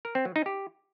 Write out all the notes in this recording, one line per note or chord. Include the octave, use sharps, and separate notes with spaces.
A#4
C4
F#3
D#4
G4